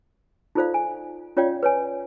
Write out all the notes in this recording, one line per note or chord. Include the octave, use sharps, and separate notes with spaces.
D#4 F4 A4 C5 D5 F5
G#5
C#4 F4 C#5 D5 F5 G5
B4 C#5 G#5